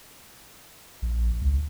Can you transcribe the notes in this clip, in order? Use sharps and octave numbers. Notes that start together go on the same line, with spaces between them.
A#1
C#2